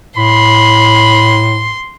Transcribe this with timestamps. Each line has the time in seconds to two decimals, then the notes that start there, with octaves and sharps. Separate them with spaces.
0.17 A2 B5 C6